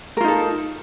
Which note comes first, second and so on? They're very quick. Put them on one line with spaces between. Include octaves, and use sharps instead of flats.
A#4 F4 D#4 A4